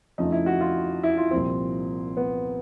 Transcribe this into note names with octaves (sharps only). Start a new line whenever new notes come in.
F2 C#3 F3 A3 D#4
E4
F#4
F4
E4
F4
C2 A#2 F3 C4
B3